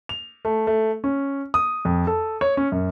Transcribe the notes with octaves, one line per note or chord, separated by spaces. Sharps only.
F7
A3
A3
C#4
D#6
F2
A4
C#5
C#4
F#2